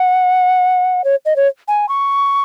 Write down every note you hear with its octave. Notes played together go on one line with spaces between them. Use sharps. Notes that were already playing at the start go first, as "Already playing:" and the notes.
Already playing: F#5
C#5
D#5
C#5
G#5
C#6